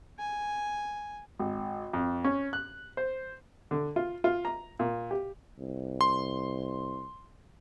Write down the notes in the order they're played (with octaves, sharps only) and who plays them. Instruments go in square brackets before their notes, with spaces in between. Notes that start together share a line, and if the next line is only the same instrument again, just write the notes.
[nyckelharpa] G#5
[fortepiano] G#1
F2
C#4
F#6
C5
D3
F4
F4
A#5
A#2
G4
[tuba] C2
[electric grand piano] C6